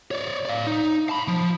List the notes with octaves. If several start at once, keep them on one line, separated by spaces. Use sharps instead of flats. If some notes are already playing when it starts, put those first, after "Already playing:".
C#5 D5
D5 F5
D#4
A5 B5
F3